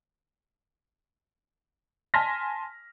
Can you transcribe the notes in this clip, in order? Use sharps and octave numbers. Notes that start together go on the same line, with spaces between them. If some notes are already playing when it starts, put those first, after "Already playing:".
G#5 A5 C6 F6 A#6 B6